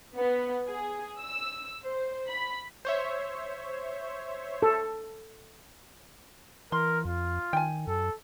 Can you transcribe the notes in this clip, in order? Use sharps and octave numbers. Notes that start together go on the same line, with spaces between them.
B3
G#4
E6
C5
B5
C5 C#5 E5
A4
E3 A#4 C6
F2 F4
D#3 G5 G#5
F#2 A4